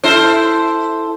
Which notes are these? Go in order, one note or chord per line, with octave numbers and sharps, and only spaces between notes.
E4 A4 C5